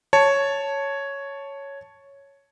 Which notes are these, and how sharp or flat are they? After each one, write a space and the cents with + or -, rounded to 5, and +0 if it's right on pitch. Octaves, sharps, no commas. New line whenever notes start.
C#5 +0 A5 +0